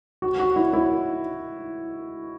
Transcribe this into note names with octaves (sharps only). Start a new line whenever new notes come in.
F#4
F#4
E4
E4